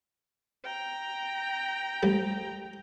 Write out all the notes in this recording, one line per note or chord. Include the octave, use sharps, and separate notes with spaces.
G5 A#5
A1 G#2 G3